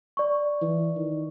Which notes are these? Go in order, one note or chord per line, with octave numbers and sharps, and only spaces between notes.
D5 C#6
E3
D#3